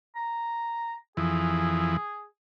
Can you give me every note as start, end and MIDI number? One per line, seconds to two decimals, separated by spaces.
0.15 0.94 82
1.17 1.97 41
1.17 1.97 52
1.17 2.26 68